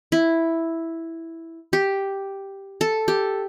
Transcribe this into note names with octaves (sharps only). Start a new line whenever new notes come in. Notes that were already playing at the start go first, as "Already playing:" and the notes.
E4
G4
A4
G4